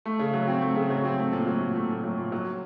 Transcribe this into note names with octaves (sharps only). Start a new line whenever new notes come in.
A3
C#3
F#3
C4
A3
C#3
F#3
C4
A3
A#2
F#3
A#2
A3
A#2
F#3
A#2
F#3